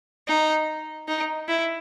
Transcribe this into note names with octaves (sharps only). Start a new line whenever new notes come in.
D#4
D#4
E4